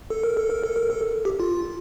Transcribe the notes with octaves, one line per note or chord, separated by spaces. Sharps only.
A4
A#4
A4
A#4
A4
A#4
A4
G4
F4